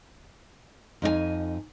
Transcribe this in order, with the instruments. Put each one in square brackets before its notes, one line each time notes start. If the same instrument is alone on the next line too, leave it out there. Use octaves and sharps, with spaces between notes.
[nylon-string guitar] F2 D#4 G4 G#5